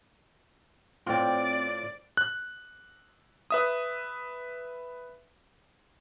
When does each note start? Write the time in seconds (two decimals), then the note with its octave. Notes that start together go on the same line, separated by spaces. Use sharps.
1.06 A2 C4 F4 D5
2.17 F#6
3.51 B4 E5 D#6